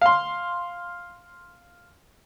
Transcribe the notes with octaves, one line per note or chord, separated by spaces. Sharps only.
F5 C6